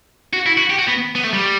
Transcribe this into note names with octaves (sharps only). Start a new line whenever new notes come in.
F#4
E4
F#4
G4
F#4
B3
B3
A3
G3